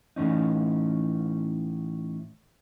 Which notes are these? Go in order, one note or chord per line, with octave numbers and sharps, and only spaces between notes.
A2 E3 C#4 D#4